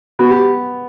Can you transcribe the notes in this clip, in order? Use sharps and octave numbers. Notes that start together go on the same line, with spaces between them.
B3 F#4
G4